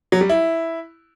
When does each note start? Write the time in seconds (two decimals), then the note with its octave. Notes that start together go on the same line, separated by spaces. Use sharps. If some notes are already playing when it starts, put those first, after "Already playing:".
0.12 F#3
0.21 G3
0.29 E4